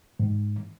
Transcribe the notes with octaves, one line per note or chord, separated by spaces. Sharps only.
G#2